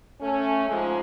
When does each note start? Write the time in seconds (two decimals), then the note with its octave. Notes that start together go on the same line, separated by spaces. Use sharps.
0.21 A3 C#4
0.67 G#2 F3 G#3